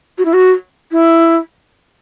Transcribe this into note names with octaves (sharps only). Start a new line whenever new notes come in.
F#4
E4
F#4
E4